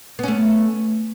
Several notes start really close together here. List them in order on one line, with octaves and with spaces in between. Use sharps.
B3 C#4 A3